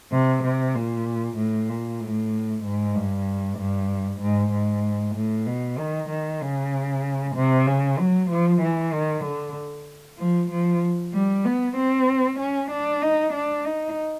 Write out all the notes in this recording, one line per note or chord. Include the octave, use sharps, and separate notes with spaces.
C3
C3
A#2
A2
A#2
A2
G#2
G2
G2
G#2
G#2
A2
B2
D#3
D#3
C#3
C3
C#3
F#3
F3
E3
D#3
D3
F3
F3
G3
B3
C4
C#4
D4
D#4
D4
D#4